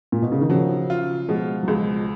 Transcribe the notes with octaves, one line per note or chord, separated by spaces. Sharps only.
A#2
B2
C#3
D#3
C#3 F3 F#3
F4
B2 F3 G#3
F#3
C#2 F3 G#3